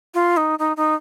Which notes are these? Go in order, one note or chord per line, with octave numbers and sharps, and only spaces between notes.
F4
D#4
D#4
D#4